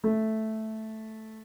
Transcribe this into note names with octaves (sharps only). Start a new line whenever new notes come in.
A3